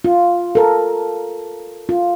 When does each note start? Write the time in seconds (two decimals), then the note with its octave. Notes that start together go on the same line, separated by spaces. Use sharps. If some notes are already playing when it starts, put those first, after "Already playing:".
0.04 F4
0.55 A4 A#4
1.89 F4